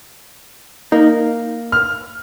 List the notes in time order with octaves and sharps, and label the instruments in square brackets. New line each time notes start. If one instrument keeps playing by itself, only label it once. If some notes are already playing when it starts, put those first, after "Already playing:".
[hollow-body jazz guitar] A#3 [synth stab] D#4
[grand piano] F6